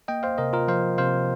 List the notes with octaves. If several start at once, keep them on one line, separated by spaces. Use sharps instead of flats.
A#3 D#5 G5
C5 F5
C3 A#4 D#5
F4 A#4
F3 C5 F5
C3 C5 F5